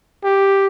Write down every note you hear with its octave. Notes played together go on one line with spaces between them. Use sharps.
G4